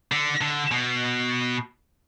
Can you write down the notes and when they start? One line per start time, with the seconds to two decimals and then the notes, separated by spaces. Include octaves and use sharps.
0.12 D3
0.41 D3
0.71 B2